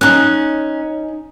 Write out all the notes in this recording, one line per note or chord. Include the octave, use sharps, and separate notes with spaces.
C#4 D#4 F#6